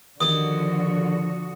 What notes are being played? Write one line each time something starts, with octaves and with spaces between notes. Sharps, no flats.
D#2 D3 F3 F#4 D#6